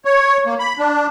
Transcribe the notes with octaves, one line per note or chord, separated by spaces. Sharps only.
C#5
A#3
B5
D4